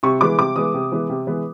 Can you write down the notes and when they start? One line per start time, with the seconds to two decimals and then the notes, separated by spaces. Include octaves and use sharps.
0.03 C3 C#6
0.21 E3 G#3 B3 D6
0.38 C3 D6
0.56 E3 G#3 B3 D#6
0.74 C3
0.92 E3 G#3 B3
1.09 C3
1.27 E3 G#3 B3